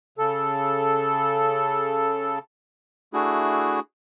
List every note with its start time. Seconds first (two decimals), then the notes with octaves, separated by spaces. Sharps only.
0.18 C#3 A4
3.13 A3 D4 E4 F#4 G#4